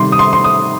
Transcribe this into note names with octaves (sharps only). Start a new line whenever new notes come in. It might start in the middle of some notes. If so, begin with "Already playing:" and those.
Already playing: C3 D#3 G3 C6
D#6
C6
C6
D#6